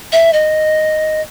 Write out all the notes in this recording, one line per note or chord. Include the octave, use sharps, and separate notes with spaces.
E5
D#5